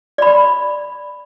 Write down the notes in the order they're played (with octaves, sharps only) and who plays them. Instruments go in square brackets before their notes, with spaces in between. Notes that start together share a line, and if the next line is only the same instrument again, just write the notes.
[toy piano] D5 B5